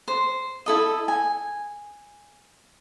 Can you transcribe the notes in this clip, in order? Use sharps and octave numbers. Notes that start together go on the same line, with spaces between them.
C5
E4 A4 D#5
G#5